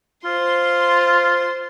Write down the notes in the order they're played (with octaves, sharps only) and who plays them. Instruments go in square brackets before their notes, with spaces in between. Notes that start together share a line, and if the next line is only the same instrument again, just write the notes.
[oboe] F4 [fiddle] C5 C6